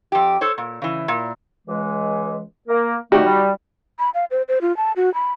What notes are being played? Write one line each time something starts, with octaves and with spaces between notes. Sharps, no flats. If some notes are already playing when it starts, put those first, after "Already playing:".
F2 G4
A4 C5 C#5
A#2
C#3 E3
A#2
C#2 E3 G#3
A#3 A#4
G3 A3 D#4 F#4 G4
G3
B5
F5
C5
C5
F4
A5
F#4
B5